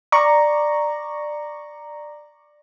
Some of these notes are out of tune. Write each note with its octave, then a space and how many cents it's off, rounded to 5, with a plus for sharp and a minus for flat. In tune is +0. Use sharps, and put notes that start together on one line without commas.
D5 +15 A#5 +0 C#6 +0